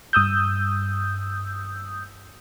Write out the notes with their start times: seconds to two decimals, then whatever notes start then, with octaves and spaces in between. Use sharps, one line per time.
0.13 G2 D#6 E6 G6